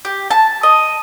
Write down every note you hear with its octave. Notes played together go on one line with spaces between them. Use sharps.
G4
A5
D#5